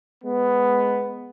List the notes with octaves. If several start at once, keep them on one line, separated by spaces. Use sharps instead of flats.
G#3 B3